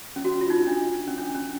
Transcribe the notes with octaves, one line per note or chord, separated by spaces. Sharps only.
C#4
F#4
F4
D#4
D4
C#4
D4
C#4